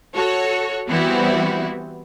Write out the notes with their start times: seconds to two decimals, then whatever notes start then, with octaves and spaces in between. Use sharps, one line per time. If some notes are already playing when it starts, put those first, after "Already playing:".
0.15 F#4 A4 C#5
0.89 E3 G3 B3 C4 E4 F#4